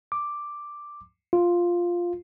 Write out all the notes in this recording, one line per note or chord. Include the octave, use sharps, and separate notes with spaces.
D6
F4